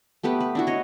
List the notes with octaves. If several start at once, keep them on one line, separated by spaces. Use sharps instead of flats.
A3 B3 G4 B4
B4
D4 E4 F#4
C#5 D#5